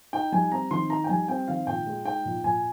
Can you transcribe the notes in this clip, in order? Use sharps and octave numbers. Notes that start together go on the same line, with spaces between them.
D#4 G5
G3 G#5
C4 A#5
D#3 C6
D#4 A#5
G5
G3 G#5
C4 G5
D#3 F5
A#2 G5
G#3
D#4 G5
A#2
A#2 G#5